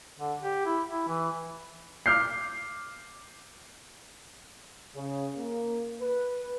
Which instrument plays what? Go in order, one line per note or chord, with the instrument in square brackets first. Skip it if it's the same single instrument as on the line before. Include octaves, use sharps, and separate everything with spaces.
[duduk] D3
G4
E4
E4
E3
[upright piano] D6 F6 G6 C7
[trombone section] C#3
A#3
B4